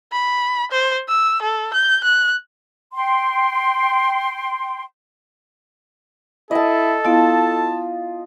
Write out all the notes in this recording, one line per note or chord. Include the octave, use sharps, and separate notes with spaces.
B5
C5
E6
A4
G6
F#6
G5 C6
E4 A4 D#5 A5
B3 E4 F4 A5